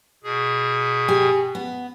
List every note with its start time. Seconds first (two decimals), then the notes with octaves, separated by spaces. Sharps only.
0.24 B2 G#4
1.08 G4 G#5
1.55 B3